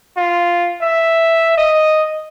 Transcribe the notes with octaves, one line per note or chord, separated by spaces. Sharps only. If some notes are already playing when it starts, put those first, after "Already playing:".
F4
E5
D#5